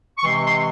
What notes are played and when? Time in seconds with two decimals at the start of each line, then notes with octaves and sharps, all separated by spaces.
0.17 C#6
0.23 C3 E3 G#3 C4 C6
0.43 C6